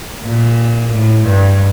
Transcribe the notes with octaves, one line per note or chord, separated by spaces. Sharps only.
A#2
A2
G2